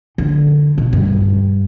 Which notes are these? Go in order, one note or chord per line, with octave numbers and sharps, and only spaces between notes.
D3
B2
G2